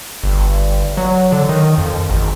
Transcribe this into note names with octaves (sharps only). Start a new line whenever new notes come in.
G1
F#3
D3
D#3
F2
G#1